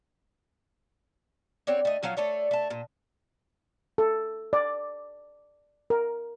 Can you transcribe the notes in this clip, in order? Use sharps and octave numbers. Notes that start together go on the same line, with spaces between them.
C4 F#4 C#5 D5
A3 D#5
F3 F#3 C#4 F5
A3 A4 C#5 D5
A3 A5
A#2
A4
D5
A#4